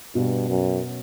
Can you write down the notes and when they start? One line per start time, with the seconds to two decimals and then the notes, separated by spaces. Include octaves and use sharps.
0.15 G2 B2
0.50 F#2